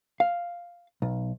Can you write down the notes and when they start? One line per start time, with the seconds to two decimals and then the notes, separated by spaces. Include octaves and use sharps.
0.20 F5
1.02 B1